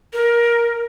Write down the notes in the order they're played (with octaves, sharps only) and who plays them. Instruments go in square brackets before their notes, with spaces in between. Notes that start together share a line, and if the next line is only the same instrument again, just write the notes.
[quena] A#4